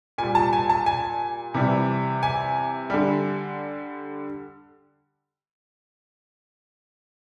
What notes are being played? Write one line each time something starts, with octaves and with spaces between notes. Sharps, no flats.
A#2 G3 G#5
A5
G#5
A5
G#5
C3 E3 G3
G#5
D3 G3